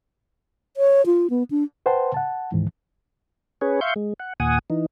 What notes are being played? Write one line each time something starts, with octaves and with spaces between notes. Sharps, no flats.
C#5
F4
B3
D4
B4 C5 F#5 G5 A5 C6
F#5 A5
D2 G#2 D#3 E3
C#4 G#4 B4 C#5
E5 F5 C6 C#6 G6
G#3
F#5
D#2 A#2 F#5 G#5 D#6
E3 D#4